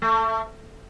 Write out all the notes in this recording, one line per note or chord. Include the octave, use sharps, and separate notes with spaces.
A3